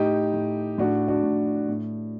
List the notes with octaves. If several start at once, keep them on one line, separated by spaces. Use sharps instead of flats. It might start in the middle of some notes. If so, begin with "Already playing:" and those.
Already playing: A2 D#4 G4
A2
A2 D4 F#4
D4 F#4
A2
A2